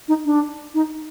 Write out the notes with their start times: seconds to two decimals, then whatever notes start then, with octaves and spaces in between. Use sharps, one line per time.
0.08 D#4
0.25 D4
0.74 D#4